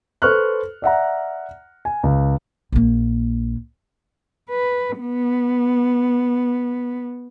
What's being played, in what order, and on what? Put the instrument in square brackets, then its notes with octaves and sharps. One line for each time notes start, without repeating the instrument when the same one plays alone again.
[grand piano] A4 B4 C5 C#6 F6 F#6
D5 E5 F#5 A#5
G#5
C#2
[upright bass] A#1 A#3
[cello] B4
B3